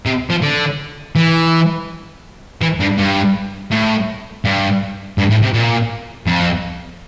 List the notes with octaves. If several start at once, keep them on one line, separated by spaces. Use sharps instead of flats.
C3
F3
D3
E3
E3
G2
G2
A2
G2
G2
A2
C3
A#2
F2